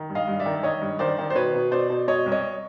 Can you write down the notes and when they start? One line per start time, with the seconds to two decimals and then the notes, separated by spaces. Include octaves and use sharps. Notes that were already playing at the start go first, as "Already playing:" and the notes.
Already playing: D#3
0.09 G2
0.15 D#5 F5
0.28 G2
0.39 D5 E5
0.46 D#3
0.63 D#3 C#5 D#5
0.81 G2
0.99 D#3 C5 D5
1.18 D#3
1.30 C5
1.35 B2 B4 C#5
1.54 B2
1.71 B2 C5 D5
1.90 B2
2.08 B2 C#5 D#5
2.26 C2
2.32 C#5 D#5